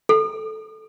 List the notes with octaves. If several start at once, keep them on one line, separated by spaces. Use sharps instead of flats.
A4